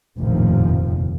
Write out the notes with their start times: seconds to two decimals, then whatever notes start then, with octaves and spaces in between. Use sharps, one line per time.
0.18 F1 A#1 D#2 A2 C3 F3